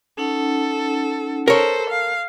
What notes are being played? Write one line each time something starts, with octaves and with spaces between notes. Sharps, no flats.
C#4 D#4 A4 F#5
A4 A#4 C5 C#5
F5